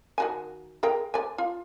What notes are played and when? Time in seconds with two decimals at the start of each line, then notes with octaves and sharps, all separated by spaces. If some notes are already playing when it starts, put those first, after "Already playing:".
0.18 D#3 F#4 G#5
0.83 G#4 A#4 G5
1.14 D5 G#5
1.38 F4